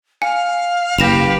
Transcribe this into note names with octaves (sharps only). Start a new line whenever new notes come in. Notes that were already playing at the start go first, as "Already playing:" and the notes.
F5 G#5
F#1 G4 B4 A#6 E7 F7